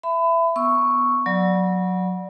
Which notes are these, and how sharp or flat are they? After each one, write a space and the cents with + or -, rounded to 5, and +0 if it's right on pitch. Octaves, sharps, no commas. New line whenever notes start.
E5 +15 B5 +30
B3 +0 C#6 +0 E6 +0
F#3 -15 D5 +0 B5 -30